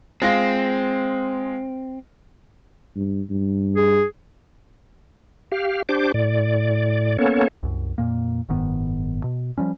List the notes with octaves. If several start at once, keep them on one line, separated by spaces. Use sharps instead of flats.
G#3 C4 F4 A#6
G2
G2
G#4
G4 F5
D4 G4 C5 D6
A2 D5
A#3 B3 C#4 A4 C#5
C2 F#2
F2 A#2 A#3
F#1 G#2 D#3 B3
B2
F3 G3 C#4